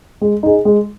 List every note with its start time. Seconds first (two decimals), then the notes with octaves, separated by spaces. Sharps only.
0.21 G#3
0.43 D#4 G#4
0.65 G#3